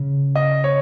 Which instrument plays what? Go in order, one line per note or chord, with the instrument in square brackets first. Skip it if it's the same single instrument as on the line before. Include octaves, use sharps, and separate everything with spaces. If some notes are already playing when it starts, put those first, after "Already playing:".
Already playing: [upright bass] C#3
[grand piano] D#5
C#5